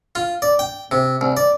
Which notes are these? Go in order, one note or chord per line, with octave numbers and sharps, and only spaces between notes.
F4
D5
G5
C3
C2
D5